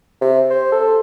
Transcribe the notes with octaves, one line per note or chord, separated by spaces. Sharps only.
C3
C5
A4